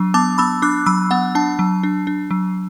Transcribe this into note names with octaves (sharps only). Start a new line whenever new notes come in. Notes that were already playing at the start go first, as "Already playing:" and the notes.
Already playing: F#3 D4
B3 A5 D6
B3 B5 E6
D4 D6 F#6
F#3 B5 E6
B3 F#5
D4 A5
F#3
D4
D4
F#3